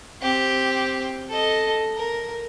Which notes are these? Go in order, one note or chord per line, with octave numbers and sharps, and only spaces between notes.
C4 G4
A4 D#5
A#4